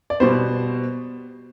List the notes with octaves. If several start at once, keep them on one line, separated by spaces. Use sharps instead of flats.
D5
B2 G3 B3 C5